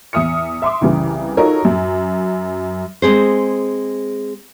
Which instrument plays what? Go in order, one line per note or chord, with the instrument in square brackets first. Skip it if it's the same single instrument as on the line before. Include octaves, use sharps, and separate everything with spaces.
[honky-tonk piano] E2 E5 D#6 F6 C#7
E5 C6 D6
C2 C#3 E3
D#4 F4 F#4 A4 A#4 C#5
F#2
[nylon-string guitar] G#3 C4 G#4 C5